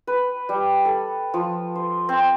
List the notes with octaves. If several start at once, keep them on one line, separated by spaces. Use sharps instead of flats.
B4
G3
A4
F3
C5
C4